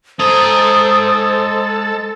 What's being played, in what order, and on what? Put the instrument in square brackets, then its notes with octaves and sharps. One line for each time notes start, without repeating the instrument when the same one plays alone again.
[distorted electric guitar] G#3 A#5 [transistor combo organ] A4 [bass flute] C5 [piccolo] D#6